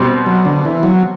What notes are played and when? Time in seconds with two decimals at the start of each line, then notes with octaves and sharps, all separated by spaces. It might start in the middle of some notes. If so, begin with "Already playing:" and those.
Already playing: B2 G3 C4
0.26 F#3
0.45 D3
0.65 E3
0.83 F#3